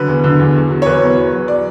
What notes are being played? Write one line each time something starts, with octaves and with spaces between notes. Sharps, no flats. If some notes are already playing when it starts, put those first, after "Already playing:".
Already playing: D3 F#3 B4
E2
D3
E2
E2
F#3
C#5
E2 B4
E2
F#3
F#3
D5